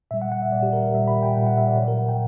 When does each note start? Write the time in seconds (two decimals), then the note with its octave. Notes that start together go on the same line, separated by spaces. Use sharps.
0.11 A#2 G3 E5
0.22 F#5
0.32 F#5
0.42 E5
0.52 A#2 G3 D5
0.63 G4
0.73 A#4
0.84 A#4
0.94 G3 E5
0.98 A#2
1.08 B5
1.23 G5
1.36 A#2 G3 F#5
1.47 F#5
1.57 E5
1.67 D5
1.77 A#2 F#3 C#5
1.88 A#4
1.99 F#5
2.09 G5